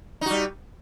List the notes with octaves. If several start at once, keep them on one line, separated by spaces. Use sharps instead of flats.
G3 D#4 F#4